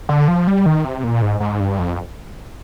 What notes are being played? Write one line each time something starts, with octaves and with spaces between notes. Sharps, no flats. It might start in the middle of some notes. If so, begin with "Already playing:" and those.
D3
F3
G3
D#3
C3
A#2
G#2
G#2
G2
F2